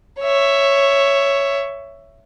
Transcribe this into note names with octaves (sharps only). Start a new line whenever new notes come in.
C#5 E5